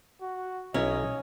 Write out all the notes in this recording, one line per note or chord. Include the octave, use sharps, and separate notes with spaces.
F#4
B1 C#4 E4 D#5 A#5